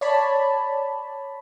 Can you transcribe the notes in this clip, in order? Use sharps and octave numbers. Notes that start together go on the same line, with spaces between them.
C#5 D5 A5 B5